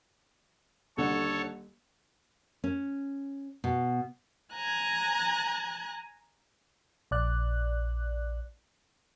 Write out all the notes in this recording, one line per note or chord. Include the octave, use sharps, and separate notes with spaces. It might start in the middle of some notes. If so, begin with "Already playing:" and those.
D#1 D3 A4 C#5
C#4
B2
G#5 A#5 F#6 G#6
A#1 D5 F#6